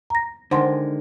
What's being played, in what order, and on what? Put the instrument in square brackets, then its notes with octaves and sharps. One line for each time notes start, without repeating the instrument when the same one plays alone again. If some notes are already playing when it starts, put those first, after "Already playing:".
[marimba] A#5 A#6
[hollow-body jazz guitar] D3 D#3 G#3 [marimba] C5 F#5 C6